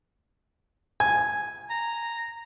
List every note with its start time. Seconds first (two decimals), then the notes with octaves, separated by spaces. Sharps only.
1.00 G#5
1.70 A#5